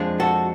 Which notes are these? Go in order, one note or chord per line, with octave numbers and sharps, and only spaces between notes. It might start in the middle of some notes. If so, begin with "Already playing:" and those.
Already playing: F2 F3 G#3 D4
F#4 A4